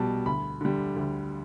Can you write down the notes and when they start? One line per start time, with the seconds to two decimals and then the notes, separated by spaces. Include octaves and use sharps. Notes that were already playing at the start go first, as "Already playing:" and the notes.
Already playing: B1 B2 G3 A5
0.26 D2 B5
0.61 D3 G3
0.96 D2